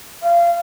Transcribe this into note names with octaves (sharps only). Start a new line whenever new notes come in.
F5